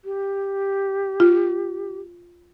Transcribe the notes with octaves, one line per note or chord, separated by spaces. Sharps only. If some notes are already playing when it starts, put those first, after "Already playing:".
G4
F4